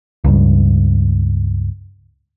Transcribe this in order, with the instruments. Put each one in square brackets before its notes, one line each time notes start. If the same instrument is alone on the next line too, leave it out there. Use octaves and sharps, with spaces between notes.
[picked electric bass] C#2 G2